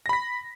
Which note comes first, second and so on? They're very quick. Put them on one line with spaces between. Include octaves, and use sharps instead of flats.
A#6 B5 B6